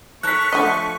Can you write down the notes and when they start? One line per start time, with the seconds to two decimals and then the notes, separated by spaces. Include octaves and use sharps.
0.23 A4 A#4 C#5 C#6 F#6 B6
0.53 D3 F3 A3 D#5 G#5